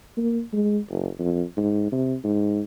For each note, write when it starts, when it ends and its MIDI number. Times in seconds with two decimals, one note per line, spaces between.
0.17 0.41 58
0.53 0.78 56
0.90 1.08 30
1.19 1.43 41
1.57 1.88 44
1.92 2.15 48
2.24 2.61 44